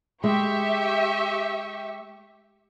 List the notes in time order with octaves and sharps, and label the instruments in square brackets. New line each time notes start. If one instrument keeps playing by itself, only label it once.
[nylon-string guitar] G#3 [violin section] G4 E5 C#6